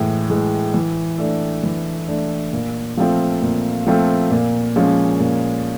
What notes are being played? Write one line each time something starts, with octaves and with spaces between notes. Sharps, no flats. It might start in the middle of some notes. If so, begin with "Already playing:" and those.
Already playing: A2 E3 G#3
E3 G#3
E3
A3 D4
E3
A3 D4
A#2
F3 A3 C4 F4
A#2
F3 A3 C4 F4
A#2
F3 G#3 C#4
A#2